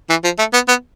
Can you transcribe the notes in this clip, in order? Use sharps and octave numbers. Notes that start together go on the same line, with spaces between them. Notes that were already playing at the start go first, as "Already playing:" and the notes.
E3
F3
A3
B3
B3